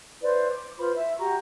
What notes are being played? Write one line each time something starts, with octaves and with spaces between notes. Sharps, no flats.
E4 B4 C5 D5
D6
F4 B4 C5 B5
E4 E5
F#4 G4 A#5 C#6